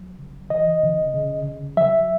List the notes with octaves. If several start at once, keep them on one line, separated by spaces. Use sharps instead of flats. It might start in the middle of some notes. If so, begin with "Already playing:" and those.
Already playing: F#3
C#3
E3 D#5
C#3
C#3
C#3
F#3 E5